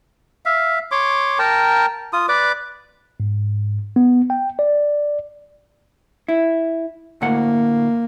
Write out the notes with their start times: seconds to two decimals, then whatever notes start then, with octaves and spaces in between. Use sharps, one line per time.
0.45 E5 F5
0.91 C#5 C6 D6
1.39 A#4 G5 A5 A#5
2.13 F4 D#6
2.29 B4 D5 D6
3.20 G#2
3.96 B3
4.30 G5
4.59 D5
6.28 E4
7.22 D2 A2 A#3 F#5